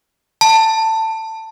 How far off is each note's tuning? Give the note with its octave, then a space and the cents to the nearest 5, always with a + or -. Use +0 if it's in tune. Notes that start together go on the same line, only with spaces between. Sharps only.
A5 +15